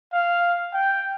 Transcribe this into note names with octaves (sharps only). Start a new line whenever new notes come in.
F5
G5